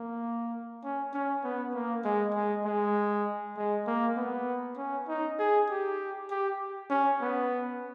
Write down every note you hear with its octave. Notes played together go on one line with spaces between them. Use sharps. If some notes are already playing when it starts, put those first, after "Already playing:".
Already playing: A#3
C#4
C#4
B3
A#3
G#3
G#3
G#3
G#3
A#3
B3
C#4
D#4
G#4
G4
G4
C#4
B3